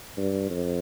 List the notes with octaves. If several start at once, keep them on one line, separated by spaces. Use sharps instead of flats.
G2
F2